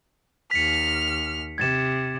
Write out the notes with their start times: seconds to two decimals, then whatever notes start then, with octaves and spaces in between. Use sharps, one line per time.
0.51 D#2 F6 B6 C#7
1.58 C3 G#6 A6 E7